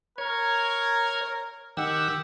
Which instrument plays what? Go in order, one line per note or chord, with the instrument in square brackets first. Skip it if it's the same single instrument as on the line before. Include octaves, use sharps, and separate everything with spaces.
[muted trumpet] A#4 [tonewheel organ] C#5 G#6
[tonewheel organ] D#3 F#5 E6 [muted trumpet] G4